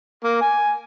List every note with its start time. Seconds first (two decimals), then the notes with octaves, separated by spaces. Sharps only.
0.24 A#3
0.41 G#5